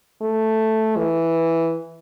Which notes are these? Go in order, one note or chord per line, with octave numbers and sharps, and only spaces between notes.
A3
E3